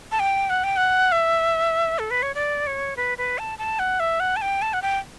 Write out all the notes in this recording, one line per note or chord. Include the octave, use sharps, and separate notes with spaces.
A5
G5
F#5
G5
F#5
E5
A4
B4
C#5
D5
C#5
B4
B4
A5
A5
F#5
E5
F#5
A5
G5
A5
F#5
G5